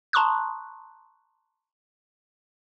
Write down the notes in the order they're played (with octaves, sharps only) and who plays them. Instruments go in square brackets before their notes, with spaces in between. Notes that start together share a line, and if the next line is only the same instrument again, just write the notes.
[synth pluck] A5 A#5 C6 C#6 D#6 F#6